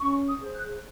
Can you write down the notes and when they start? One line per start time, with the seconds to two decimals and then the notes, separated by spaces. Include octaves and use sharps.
0.01 C#4 C#6
0.27 D#6
0.41 G#4 C5
0.54 F#6